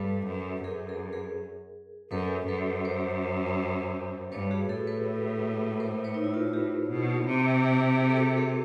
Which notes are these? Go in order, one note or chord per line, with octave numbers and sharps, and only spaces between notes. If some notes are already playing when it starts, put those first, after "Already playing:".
Already playing: G2 A4 B4
F#2
F#2 G#4 A#4
G#4 A#4
G#4 A#4
F#2 A4 B4
F#2 A4 B4
A#4 C5
G2 B4 C#5
F#4 G#4
A2 G4 A4
A4 B4
A#4 C5
B4 C#5
D#4
E4
F4
F#4
A2 F4 G4
B2
C3
G#4
A4
F#4 G#4
G#4 A#4